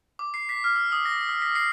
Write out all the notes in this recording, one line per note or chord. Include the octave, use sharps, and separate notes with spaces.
D6
C7
B6
F6
E6
D#6
A#6
E6
B6
C7